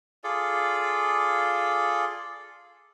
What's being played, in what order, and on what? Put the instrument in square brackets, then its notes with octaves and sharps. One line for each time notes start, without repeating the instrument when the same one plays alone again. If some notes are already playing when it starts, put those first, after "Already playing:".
[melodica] F4 G#4 A4 D5